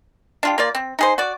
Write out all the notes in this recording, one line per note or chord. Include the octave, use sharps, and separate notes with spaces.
D4 F4 G4
A#3 F4 D5
C4
D#4 G#4 C5
F#4 D5